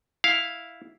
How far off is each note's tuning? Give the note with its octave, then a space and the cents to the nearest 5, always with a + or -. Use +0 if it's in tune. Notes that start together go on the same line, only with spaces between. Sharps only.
E4 +0 F5 +0